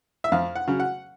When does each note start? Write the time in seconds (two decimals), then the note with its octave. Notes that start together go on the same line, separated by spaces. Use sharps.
0.24 E5
0.32 F2 F5
0.55 F#5
0.68 C#3 F#3
0.80 F#5